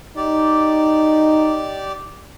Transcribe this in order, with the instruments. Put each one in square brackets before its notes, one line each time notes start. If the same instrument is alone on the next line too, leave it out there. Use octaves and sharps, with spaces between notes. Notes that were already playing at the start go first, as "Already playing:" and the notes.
[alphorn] D#4 [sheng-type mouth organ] G4 D5